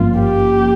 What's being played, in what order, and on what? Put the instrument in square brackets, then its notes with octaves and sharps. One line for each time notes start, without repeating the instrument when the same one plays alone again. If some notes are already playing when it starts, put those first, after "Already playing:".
Already playing: [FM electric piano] G#1 G2 F3 A#3 C#4 [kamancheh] F4
[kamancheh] G4